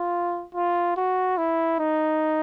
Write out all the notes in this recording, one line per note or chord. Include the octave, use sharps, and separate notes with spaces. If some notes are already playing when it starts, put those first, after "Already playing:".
Already playing: F4
F4
F#4
E4
D#4